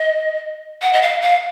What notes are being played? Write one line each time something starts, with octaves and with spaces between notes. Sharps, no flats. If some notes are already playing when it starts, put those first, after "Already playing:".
Already playing: D#5
F#5
D#5
F5
F5